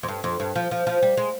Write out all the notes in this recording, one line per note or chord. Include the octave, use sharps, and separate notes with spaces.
F2
G2
F2
G2
F3
F3
F3
G3
G#3